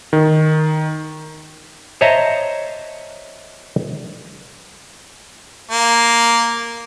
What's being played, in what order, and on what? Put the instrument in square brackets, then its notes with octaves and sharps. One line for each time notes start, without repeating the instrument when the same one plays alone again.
[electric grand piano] D#3
[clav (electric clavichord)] C5 C#5 D#5 E5 A5 A#5
[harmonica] A#3